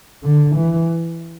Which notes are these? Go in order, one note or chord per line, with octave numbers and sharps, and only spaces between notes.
D3
E3